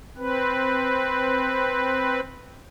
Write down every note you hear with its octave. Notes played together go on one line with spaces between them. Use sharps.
C4 B4